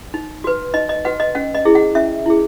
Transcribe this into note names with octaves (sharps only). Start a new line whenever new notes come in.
D#4
F#4 B4
D#4 D#5
D#5
F#4 B4 F#5
D#5
C#4 F#5
D#5
E4 G#4
F#5
C#4 E5
E4 G#4